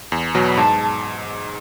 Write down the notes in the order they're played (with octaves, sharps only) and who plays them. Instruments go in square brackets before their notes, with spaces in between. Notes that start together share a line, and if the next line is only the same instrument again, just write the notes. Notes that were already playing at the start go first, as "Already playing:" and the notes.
[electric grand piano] E2
B2 F#3
[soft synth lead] B5
[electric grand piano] G#2 [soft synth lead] A5